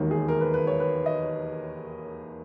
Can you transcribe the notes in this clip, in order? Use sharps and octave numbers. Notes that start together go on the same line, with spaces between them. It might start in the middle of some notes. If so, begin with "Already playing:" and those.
Already playing: E1 D#2 D#3
G#4
A#4
B4
B4
C#5
B4
D#5